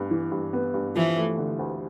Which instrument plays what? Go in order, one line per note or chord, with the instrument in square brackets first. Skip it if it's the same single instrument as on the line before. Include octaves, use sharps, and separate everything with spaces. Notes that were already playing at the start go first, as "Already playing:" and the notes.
Already playing: [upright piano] G2 B3
E3
G2
B3
G2
[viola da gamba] E3 [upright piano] F3
[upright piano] A3
D3
D2